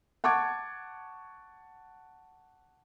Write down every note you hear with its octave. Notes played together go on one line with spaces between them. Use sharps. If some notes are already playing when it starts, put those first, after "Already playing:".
F#5 A5 C#6 D6 G#6